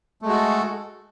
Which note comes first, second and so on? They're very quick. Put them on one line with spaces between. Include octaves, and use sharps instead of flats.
A3 G#3 F#4 A4